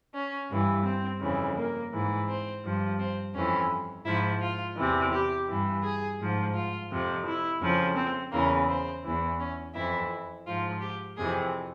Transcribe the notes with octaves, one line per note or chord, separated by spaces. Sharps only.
C#4
G2 E3
C4
F2 C#3 E3
A#3
G#2 E3
C4
G2 F3
C4
F2 E3 C#4
G#2 F3 E4
F4
E2 C3 E3
G4
G2 E3
G#4
G#2 F3
F4
F2 C3 F3
E4
F2 C#3 F3
C4
E2 C#3 E3 A#3
C4
E2 E3
C#4
F2 E3 E4
G#2 F3 F4
G4
F2 C3 E3 G#4